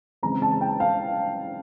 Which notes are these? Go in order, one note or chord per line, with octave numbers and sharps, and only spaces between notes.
C#3 E3 G#3 C4 A#5
A5
G5
F5